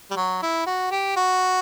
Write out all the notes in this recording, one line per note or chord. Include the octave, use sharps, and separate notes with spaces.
G3
F#3
E4
F#4
G4
F#4